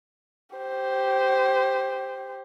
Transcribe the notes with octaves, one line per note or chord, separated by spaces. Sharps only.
G4 C5